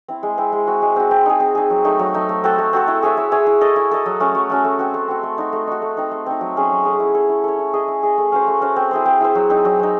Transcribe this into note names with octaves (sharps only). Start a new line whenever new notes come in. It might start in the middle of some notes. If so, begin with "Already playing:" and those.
C4 E4
G#3
C4 E4
G#3
C4 F#4
G#3
C4 F#4
C4
D#4 G#4
C4
D#4 G#4
F#3
A3 D#4
F#3
A3 D#4
A3
C4 F#4 A4
A3
C4 F#4 A4
E4
G#4 C#5 E5
E4
G#4 C#5 E5
E4
A4 D#5
E4
A4 D#5
F#3
A3 C#4 F#4
F#3
A3 C#4 F#4
A3
C4 F#4
A3
C4 F#4
A3
D#4 F#4
A3
D#4 F#4
A3
C4 D#4
A3
C4 D#4
F#3
A3 C#4 G#4
F#3
A3 C#4 G#4
E4
A4 C#5
E4
A4 C#5
E4
G#4 D#5
E4
G#4 D#5
A3
C#4 F#4 C5
A3
C#4 F#4 C5
C4
E4 G#4 C5
C4
E4 G#4 C5
F#3
C4 D#4
F#3
C4 D#4